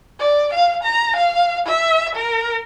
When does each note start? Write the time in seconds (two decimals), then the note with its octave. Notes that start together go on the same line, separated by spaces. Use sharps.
0.20 D5
0.54 F5
0.83 A#5
1.16 F5
1.67 E5
2.15 A#4